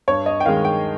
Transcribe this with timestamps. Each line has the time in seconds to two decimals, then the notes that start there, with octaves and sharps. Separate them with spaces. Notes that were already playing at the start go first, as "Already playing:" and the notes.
0.08 G2 C#5
0.26 D#5
0.40 G5
0.46 D#3 G#3 F5
0.65 G5